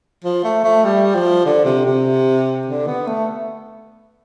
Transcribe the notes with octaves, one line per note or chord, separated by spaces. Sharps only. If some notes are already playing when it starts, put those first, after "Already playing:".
F3
A3
A3
G3
F3
D3
C3
C3
D3
B3
A3